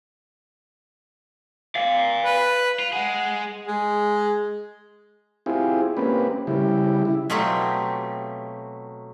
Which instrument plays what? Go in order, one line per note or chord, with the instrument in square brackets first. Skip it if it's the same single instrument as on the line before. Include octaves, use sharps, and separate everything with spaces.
[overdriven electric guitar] D5 F5
[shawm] B4
[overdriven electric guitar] F4
[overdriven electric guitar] G#3 G#4 [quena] F#5
[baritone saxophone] G#3
[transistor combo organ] C4 E4 F4 G4 G#4
A#3 C4 C#4 G4 B4
C#3 G3 E4 G4
E4
[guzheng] B2 F#3 A3 C4 F4 G4